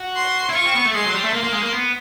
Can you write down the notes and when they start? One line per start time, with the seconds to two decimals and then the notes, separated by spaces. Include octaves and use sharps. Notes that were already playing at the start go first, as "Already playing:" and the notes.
Already playing: F#4
0.16 C6
0.49 E4
0.55 F4 C#6
0.65 C4
0.75 B3
0.85 A3
0.94 G#3 C6
1.04 F#3
1.14 G3
1.24 A3
1.33 A#3 C6
1.43 A#3
1.53 G#3
1.62 A#3
1.73 B3